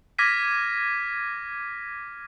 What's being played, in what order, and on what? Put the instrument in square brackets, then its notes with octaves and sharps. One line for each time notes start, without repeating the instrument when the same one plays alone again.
[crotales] D6 F6 G#6 A#6 B6 D#7